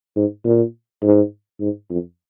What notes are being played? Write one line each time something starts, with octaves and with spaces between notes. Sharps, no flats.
G#2
A#2
G#2
G#2
F2